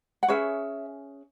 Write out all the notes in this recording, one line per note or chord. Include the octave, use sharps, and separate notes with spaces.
F#5
C#4 G#4 B4 C#5 E5